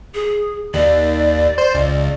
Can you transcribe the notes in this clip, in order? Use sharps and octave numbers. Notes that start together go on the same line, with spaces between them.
G#4
D#2 D5
C5
C#2